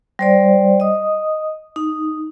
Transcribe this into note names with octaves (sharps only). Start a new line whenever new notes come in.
G3 C5 D5
D#5 D#6
D#4